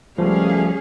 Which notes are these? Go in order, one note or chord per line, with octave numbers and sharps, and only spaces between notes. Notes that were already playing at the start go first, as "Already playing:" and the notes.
C#2 F3 G3 A3 C#4 G#4 F5